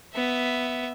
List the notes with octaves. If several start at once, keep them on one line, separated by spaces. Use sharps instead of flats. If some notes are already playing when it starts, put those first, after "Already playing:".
B3 E5